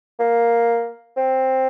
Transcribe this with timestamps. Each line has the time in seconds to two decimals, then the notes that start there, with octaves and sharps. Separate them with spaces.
0.19 A#3
1.17 C4